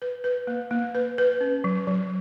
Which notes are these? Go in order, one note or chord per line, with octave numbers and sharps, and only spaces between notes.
B4
B4
A#3
A#3
B4
B4
C#4
F#3
F#3